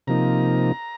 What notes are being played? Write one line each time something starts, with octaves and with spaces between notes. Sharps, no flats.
C3 F3 A#3 D#4 A#5